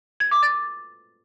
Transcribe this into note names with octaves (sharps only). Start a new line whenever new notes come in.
G#6
D6
A6